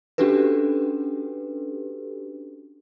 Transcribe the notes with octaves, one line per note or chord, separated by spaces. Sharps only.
C#4 D4 F#4 G4 A4 B4